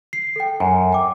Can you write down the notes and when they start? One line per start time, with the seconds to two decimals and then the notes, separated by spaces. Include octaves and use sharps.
0.13 C7
0.36 A4 G5
0.60 F#2 G#5
0.93 G5 D6